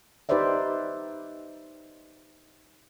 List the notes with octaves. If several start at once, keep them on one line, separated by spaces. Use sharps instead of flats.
D#4 G4 B4 C5 D5 E5